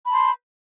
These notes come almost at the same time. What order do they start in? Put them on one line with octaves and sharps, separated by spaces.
B5 A5 C6